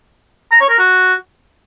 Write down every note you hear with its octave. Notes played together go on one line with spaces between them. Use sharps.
A#5
C#5
A#4
F#4